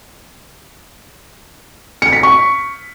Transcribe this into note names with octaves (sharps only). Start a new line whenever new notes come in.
C#7
B6
C#6